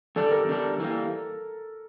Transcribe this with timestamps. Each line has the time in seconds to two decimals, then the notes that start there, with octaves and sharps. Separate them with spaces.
0.16 E2 D3 G3 D4 A4
0.32 A#4
0.48 E2 D3 G3 D4
0.80 E3 G3 A#3